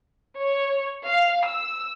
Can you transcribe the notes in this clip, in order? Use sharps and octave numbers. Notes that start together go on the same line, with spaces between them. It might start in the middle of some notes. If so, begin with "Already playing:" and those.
C#5
F5
E6